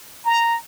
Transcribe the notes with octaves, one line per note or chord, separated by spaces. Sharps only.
A#5